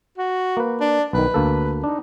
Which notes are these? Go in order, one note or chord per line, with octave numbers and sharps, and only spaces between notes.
F#4
A#3 B4
D4
B1 D#3 B4
D2 A#3 A4
D4 D#4